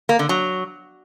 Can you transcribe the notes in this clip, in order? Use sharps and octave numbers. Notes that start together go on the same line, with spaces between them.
A#3
D3
F#3